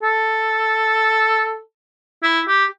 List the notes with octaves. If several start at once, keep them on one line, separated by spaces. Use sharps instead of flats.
A4
E4
G4